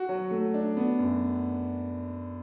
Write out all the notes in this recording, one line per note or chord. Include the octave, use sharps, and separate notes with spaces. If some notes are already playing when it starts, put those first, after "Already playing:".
Already playing: F#4
F#3
A3
D4
B3
F#2